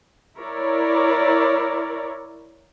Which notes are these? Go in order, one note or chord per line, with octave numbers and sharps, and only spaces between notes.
E4 A#4 C#5 D5